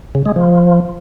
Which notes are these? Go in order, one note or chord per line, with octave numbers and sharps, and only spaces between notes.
C#3
G#3
F3